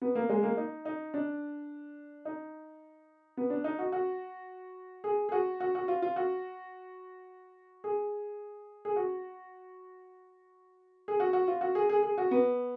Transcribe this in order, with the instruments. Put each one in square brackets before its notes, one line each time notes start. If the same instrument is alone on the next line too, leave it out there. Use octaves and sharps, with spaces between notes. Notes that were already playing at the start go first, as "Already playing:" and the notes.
[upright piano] B3
A#3
G#3
A#3
D#4
D#4
D4
D#4
B3
D4
D#4
F#4
F#4
G#4
G#4
F#4
F#4
F#4
F4
F4
F#4
G#4
G#4
F#4
G#4
F#4
F#4
F4
F#4
G#4
G#4
G#4
F#4
B3